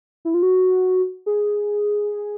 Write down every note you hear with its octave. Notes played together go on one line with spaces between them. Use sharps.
E4
F4
F#4
G#4